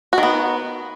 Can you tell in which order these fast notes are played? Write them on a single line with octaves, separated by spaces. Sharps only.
F#4 D#3 B3